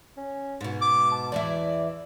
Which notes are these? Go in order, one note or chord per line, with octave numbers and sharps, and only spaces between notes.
C#4
G#2 B2
D6
A5
E2 E3 E4 D5